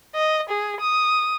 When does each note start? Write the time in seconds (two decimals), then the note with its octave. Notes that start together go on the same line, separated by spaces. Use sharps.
0.15 D#5
0.49 G#4
0.80 D#6